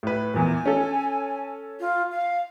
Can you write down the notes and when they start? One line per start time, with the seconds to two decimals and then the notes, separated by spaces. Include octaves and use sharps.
0.03 A2 B4
0.34 E2 A#2 G#5
0.66 C#4 A4
1.80 F4
2.11 F5